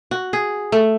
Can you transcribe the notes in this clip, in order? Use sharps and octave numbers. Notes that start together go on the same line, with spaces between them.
F#4
G#4
A3